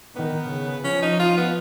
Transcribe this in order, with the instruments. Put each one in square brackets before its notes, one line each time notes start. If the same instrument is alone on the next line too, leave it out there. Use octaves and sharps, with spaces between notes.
[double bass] D#3 [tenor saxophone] B3
[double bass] C#3
[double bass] F3 [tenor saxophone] C#4
[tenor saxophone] D#4
F4
B3